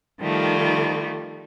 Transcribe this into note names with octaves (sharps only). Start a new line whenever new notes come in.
D#3 F3 G3 A3